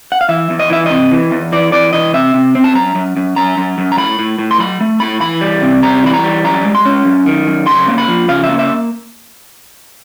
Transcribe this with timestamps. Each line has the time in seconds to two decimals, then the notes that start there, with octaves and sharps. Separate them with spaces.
0.12 F#5
0.21 F5
0.29 E3 E5
0.50 E2
0.59 D#5
0.70 E3 E5
0.86 C3 D#5
1.12 E3
1.31 E2
1.52 E3 D5
1.72 E3 D5
1.93 E3 D#5
2.14 C3 E5
2.34 C3
2.55 C4
2.64 A5
2.75 F#2 A#5
2.95 F#2
3.16 F#2
3.36 F#2 A#5
3.58 F#2
3.78 F#2
3.92 A#5
3.97 A2 B5
4.19 A2
4.39 A2
4.51 C6
4.59 F#3 B5
4.80 A3
5.00 A2 B5
5.21 E3 B5
5.41 G3
5.62 C3
5.83 G3 A#5
6.03 E3 B5
6.14 A#5
6.23 G3
6.44 F#2 A#5
6.64 G#3
6.75 C6
6.85 C#4
7.05 F#2
7.26 D#3
7.47 F#2
7.67 C#3 C6
7.88 A#3
7.98 B5
8.08 F3
8.28 C#3 F5
8.44 E5
8.49 A#3
8.59 E5